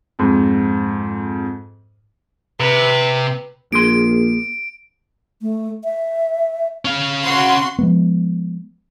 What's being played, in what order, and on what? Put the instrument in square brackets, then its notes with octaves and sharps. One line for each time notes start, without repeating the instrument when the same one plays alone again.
[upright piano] F2 G#2
[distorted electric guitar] C3 [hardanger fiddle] B4
[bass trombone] A#1 [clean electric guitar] A#3 G#4 C6 [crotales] D7
[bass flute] A3
E5
[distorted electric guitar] C#4 F5
[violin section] F#4 C6
[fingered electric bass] F3 G#3 B3